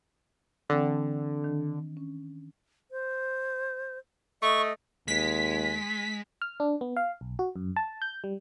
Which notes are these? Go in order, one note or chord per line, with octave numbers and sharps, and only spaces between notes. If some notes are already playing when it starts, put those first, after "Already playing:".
D3 E3 C4 G5
D#3 D4
C#4
C5
A3 D#5 C#6
D#2 G#3 B6
F6
D4
B3
F5
B1
F#4
F#2
A5
G6
G3